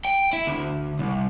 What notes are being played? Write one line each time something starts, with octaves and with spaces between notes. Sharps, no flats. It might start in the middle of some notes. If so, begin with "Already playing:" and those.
G5
E4
D2
C2